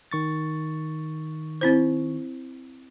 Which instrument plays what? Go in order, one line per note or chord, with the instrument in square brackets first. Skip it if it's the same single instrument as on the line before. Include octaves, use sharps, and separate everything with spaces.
[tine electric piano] D#3 C#6 A6
[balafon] C4 E4 C5